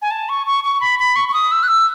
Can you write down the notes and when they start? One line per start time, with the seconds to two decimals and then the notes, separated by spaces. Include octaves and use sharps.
0.02 G#5
0.11 A5
0.29 C#6
0.47 C#6
0.64 C#6
0.81 B5
0.99 B5
1.16 C#6
1.29 C#6
1.34 D#6
1.52 E6
1.63 F#6
1.68 E6